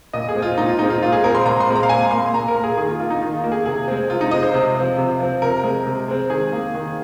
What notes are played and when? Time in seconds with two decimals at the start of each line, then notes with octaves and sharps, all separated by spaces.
0.13 A#2 D#5
0.29 G#4
0.35 G#3 C4
0.42 F4
0.57 A#2 D#4
0.69 F4
0.79 G#3 C4 D#4
0.90 F4
1.02 A#2 F4
1.12 G#4
1.24 G#3 C4 A#4
1.35 C6
1.45 A#2 A#5
1.60 C6
1.68 G#3 C4
1.75 A#5
1.83 F5
1.89 A#2 G#5
2.11 A#3 C6
2.34 A#2 A#5
2.48 A#4
2.56 A#3
2.64 G#4
2.77 D#3 G#4
2.88 F4
2.99 A#3 F4
3.10 D#4
3.22 D#3 F4
3.44 A#3
3.52 G#4
3.66 C3 G#4
3.88 G#3 C4
4.09 C3 F4
4.21 D#4
4.31 G#3 C4 D#5
4.43 C5
4.54 C3
4.76 F3 C4
4.98 C3
5.20 F3 C4
5.42 C3 A#4
5.64 G#3 C4
5.87 C3
6.08 G#3 C4
6.30 D#3 G#4
6.52 A#3
6.74 D#3